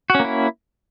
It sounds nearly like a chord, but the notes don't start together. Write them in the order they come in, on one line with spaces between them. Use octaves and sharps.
F#4 C#4 A#3 E4